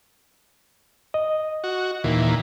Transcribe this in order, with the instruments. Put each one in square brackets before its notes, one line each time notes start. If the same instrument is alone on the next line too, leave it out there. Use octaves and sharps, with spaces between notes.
[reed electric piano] D#5
[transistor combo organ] F#4
D#2 A#2 E3